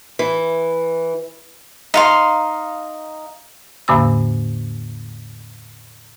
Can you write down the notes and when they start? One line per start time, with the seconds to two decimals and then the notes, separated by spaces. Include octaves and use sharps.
0.19 E3
1.94 D#4 F5 C6
3.88 E2 A2 D3 A#3 B5 E6